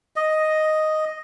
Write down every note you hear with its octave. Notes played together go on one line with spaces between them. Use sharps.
D#5